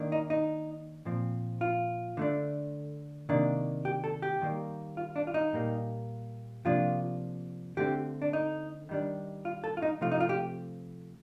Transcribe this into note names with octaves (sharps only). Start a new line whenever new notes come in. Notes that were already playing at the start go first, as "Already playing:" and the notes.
Already playing: D#3 A#3 D4
D#4
D#4
A#2 F3 C4
F4
D3 A3 D4
C3 D#3 A#3 D4
G4
A4
G4
D#3 G3 A#3
F4
D4
F4
D#4
A#2 G3 A#3
C3 F3 A#3 D4 F4
D3 A3 C4 G4
D4
D#4
D#3 G3 D4
F4
A4
F4
D#4
C3 F3 A3 C4 F4
D#4
F4
G4